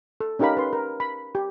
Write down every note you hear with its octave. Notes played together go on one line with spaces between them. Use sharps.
A4
C#4 D#4 G4 A#4 F5 B5
B4 C6
A#4
B5
G4